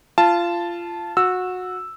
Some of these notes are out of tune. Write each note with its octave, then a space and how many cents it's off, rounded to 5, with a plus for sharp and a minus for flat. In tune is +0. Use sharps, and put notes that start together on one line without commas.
F4 -20 A5 -5
F#4 -20 E6 +0